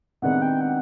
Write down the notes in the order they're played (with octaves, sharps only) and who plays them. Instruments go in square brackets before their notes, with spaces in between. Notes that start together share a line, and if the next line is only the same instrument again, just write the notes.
[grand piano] C3 D#3 G#3 B3 D4 [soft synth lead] F#5
[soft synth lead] G5
F#5